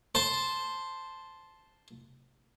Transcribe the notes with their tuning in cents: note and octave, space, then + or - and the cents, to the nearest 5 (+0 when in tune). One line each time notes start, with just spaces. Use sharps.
C5 +0 A5 -5